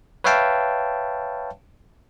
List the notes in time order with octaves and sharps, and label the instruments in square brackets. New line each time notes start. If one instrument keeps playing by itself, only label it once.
[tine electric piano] B4 C#5 E5 F5 G5 A5